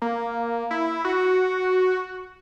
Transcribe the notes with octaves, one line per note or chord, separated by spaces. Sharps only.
A#3
E4
F#4